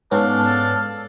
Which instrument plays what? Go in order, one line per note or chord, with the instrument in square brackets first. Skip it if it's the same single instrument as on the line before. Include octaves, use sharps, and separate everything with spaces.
[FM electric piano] G#2 B3 C#4 [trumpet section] D4 A4 F5